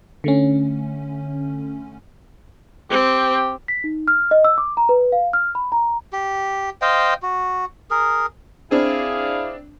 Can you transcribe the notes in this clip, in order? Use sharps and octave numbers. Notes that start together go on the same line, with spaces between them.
D3 A3 C#4
C4 G4
B6
D#4
F6
D#5
E6
D6
A#5
B4
F5
F6
B5
A#5
G4
C5 D#5 F5 G5
F#4
G#4 A#4
C4 D4 E4 G#4 F5